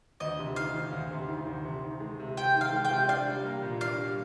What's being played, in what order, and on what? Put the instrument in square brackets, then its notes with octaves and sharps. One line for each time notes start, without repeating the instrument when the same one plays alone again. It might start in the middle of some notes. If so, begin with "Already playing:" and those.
[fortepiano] D2 [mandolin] D#5
[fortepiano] C3
[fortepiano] D#3 [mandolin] F5
[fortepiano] D2
D2
C3
D#3
D2
C3
D#3
G#3
C3
[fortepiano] C3 [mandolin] G5
[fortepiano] D#3
[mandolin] F5
[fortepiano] G#3
[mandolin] G5
[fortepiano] C3
[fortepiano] D4 [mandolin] F5
[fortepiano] G3
A#3
A#2
[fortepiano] D4 [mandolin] F5
[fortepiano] G3